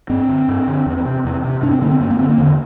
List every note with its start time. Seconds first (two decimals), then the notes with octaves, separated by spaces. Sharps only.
0.10 G2 C4
0.29 D3
0.48 G2
0.67 D3
0.86 E2
1.05 C3
1.25 E2
1.44 C3
1.62 G2 D4
1.71 C4
1.81 D3 A#3
1.91 C4
2.00 G2 A#3
2.10 A#3
2.19 D3 C4
2.29 A#3
2.38 E2 D3